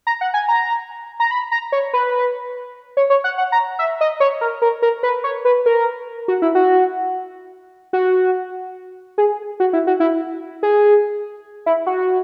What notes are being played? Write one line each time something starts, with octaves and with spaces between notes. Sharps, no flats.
A#5
F#5
G#5
A#5
A#5
B5
A#5
C#5
B4
C#5
C#5
F#5
F#5
A#5
E5
D#5
C#5
A#4
A#4
A#4
B4
C#5
B4
A#4
F#4
E4
F#4
F#4
G#4
F#4
E4
F#4
E4
G#4
E4
F#4